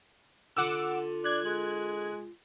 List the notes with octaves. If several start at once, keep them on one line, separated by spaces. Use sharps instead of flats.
D3 F4 F#5 D6 E6
D4 F#6 G#6
G#3